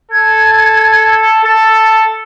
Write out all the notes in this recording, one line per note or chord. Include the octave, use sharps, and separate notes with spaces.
A4 G#6
A4 A6